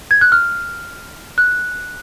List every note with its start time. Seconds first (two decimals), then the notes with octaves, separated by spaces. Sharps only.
0.11 G#6
0.21 F#6
0.32 F6
1.38 F#6